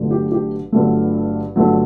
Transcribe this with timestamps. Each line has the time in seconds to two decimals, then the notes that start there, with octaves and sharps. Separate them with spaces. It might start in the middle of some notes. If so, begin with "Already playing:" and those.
Already playing: G1 G2 D3 F#3 A3
0.11 G4
0.32 G4
0.72 G1 G2 D3 F#3 A3
1.56 G1 G2 D3 F#3 A3